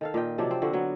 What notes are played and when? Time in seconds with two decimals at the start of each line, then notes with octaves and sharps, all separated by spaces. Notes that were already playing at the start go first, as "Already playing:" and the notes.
0.01 D#3 A4 F5
0.14 A#2 D#5 G5
0.38 C3 F3 F#3 D4
0.51 C4
0.62 A#2 D3 F#4
0.73 F#3 B3